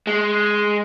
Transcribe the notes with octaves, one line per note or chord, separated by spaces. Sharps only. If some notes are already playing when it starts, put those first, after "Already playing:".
G#3